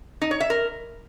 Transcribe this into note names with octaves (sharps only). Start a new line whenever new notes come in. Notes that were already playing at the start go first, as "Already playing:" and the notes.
D#4
C#5
E5
A#4